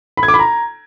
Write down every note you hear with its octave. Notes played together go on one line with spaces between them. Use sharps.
B5
G#6
D6
B5
A#5